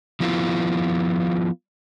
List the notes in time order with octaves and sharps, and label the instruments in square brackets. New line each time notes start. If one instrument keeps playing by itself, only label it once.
[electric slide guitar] F3 B3 E4 F4